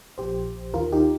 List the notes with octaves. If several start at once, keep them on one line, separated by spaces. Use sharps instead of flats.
A#1 A#2 F3 G4 C5
D#2 D#3 F4 A#4
D#4 G4